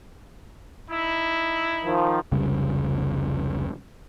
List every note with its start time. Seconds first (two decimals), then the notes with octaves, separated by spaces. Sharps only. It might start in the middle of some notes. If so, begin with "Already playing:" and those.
0.89 D#4 E4
1.85 D#3 F3
2.32 F1 C#2 C#3 G3